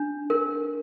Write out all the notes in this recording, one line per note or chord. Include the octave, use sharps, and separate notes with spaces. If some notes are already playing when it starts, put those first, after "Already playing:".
Already playing: D4
A#4